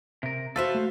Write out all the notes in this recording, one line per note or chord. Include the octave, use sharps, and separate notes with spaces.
C3 A#4
F#4 A4 B4 C5 E5 F5
A3